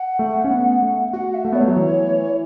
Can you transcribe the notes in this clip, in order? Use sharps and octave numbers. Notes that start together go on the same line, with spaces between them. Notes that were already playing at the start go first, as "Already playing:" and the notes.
Already playing: F#5
A3
C#4
B3
A3
F#4 F#5
E5
A3
B3 C#5
A3
F#3
E3